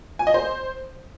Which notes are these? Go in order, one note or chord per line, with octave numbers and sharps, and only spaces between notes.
G#5
D#5
C5